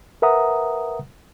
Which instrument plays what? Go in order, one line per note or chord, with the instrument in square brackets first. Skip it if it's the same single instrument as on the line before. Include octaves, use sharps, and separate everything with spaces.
[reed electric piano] A#4 B4 E5 F#5 A#5 D#6